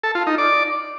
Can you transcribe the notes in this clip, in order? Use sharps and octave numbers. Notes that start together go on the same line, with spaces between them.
A4
F4
D#4
D5